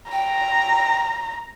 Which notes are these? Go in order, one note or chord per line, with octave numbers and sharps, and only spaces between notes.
G5 A#5